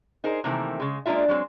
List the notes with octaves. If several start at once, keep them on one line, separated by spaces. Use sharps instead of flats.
D#4 G#4 A#4 C5
C3 D#3 E3 A3 A#3 C4
C#3 G#3
G#3 A#3 D4 E4 F4 E5
F#3 G#3 C4